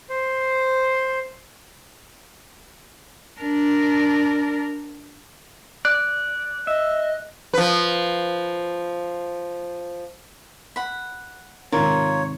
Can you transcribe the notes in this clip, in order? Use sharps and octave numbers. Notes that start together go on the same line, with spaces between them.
C5
D4 A#4
D5 F#6
D#5 E5
F3 B4
F#5 B5
G#2 C3 D#3 F4 A#4 C#5 D5